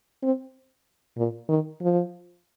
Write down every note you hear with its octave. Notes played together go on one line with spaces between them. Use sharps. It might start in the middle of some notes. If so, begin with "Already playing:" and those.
C4
A#2
D#3
F3